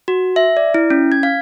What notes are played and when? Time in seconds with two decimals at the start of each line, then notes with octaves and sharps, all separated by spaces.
0.08 F#4
0.36 E5
0.57 D5
0.74 E4
0.90 C#4
1.12 G#6
1.23 F5